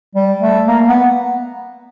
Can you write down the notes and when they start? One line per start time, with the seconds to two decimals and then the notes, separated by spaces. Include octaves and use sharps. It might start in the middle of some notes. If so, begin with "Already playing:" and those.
0.15 G3
0.41 A3
0.68 A#3
0.89 B3